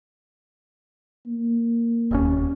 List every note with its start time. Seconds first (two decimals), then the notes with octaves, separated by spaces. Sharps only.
1.27 A#3
2.11 E1 D#2 C#4